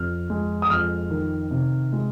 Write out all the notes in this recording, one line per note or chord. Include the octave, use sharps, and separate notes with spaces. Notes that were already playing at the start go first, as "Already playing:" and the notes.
Already playing: F2 F6
G#3
D#6
F2 F6
D#3
C3
G#3